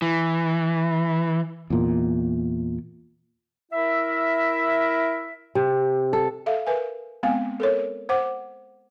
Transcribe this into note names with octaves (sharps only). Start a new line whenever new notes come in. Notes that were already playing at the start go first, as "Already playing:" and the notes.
E3
E2 A#2
E4 A#4 E5
C3
A4
A4 E5 F5
A#4 B4 E5 G#5
G#3 B3 C4 F5 G#5
A4 A#4 C#5
C5 F#5 D6